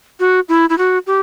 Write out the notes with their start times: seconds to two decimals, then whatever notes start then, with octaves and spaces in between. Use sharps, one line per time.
0.20 F#4
0.49 E4
0.70 E4
0.78 F#4
1.06 G4